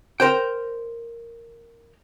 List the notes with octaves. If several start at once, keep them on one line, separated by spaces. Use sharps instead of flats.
A#4 C5 G5